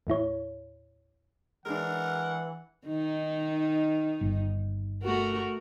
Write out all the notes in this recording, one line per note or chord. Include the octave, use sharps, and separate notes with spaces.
D#2 A2 E4 C#5
E3 G#3 D4 A#4 F#5
D#3 D#4
G1
A3 F#4 A#4